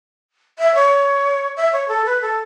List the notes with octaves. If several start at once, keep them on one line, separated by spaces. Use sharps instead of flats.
E5
C#5
E5
C#5
A4
B4
A4